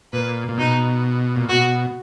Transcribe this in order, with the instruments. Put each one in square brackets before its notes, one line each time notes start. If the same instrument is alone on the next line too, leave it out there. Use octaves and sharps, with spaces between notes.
[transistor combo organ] A#2 [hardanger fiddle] B4
[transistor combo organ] A#2
[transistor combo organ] B2 [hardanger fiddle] D#4
[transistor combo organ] A#2
[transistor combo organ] B2 [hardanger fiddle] F#4